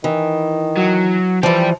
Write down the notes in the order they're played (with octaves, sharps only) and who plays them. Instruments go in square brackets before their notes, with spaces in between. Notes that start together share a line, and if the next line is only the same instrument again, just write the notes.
[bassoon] D#3 [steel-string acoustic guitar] E3
[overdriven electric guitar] F#3
[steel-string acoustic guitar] E3 F3 [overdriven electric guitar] G4 D5